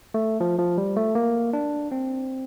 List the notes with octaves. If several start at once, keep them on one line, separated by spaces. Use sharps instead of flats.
A3
F3
F3
G3
A3
A#3
D4
C4